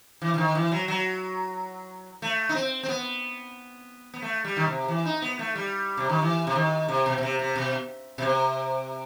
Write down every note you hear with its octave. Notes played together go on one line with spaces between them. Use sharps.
E3
E3
D#3
E3
F#3
F#3
A3
D#4
C4
C4
B3
B3
A3
G3
D#3
C3
E3
D#4
B3
A3
G3
C3
D#3
E3
C3
D#3
C3
B2
B2
C3
C3
B2
B2
C3